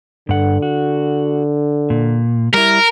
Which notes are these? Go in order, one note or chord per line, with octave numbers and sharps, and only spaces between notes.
G2 D3 F#5
F#4
A#2
G3 E4 A#4